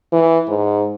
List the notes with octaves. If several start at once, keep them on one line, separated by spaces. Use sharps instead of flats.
E3
G#2